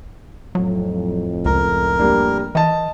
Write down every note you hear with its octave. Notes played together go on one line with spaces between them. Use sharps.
F2 A2 F#3
C#2 A#4
G3 A#3 D4
E3 D#5 A5